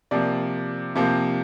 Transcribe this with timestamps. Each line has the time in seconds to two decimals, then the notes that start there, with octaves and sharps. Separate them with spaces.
0.11 C3 F3 A#3 D5
0.95 C3 F3 A#3